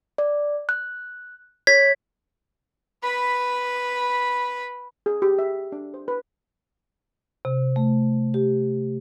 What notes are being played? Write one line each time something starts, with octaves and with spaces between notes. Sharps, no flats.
D5
F#6
C#5 G#6 B6
B4 B5
G#4
G4
E5
D4
C5
B4
C3
A3
G4